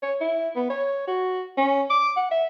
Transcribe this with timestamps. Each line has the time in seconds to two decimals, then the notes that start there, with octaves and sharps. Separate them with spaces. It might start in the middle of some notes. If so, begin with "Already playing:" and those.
0.02 C#5
0.20 E4
0.55 B3
0.70 C#5
1.07 F#4
1.57 C#4
1.90 D6
2.17 F#5
2.31 E5